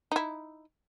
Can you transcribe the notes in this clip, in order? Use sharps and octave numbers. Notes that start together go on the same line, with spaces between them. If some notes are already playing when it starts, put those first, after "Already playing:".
D#4 E4